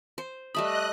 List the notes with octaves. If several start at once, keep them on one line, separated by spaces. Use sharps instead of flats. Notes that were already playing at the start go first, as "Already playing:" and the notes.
C5
G3 A3 D#5 B5 D#6 F#6 E7